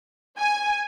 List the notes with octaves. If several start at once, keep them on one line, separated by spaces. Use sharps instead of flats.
G#5